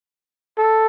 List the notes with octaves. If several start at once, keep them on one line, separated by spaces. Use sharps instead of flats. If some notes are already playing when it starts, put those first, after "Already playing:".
A4